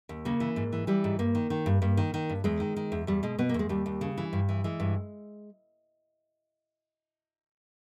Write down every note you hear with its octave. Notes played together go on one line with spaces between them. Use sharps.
D#2
C#3 A#3
E3
G#2
E3
E3 G3
G#2
G2 A#3
D#3
D#3
G2
G2 A#3
D#3
D#3
G2
E2 G#3
D#3
D#3
E2
E2 G3
B2 G#3
B2 B3
A#3
E2
G#3
D#2 G3
D#2
C#3
E3
G2
E3
E3 G#3
G2